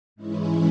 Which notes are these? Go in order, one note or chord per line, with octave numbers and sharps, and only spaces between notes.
G#2 E3 G#3 C#4 E4